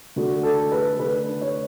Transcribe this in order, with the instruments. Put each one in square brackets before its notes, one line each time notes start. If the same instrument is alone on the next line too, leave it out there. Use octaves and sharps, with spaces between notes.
[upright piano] D3 A3 F#4
A4
B4
D3 A3 B4
C#5